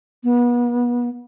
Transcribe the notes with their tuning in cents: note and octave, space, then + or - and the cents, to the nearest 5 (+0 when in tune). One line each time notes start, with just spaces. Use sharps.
B3 -35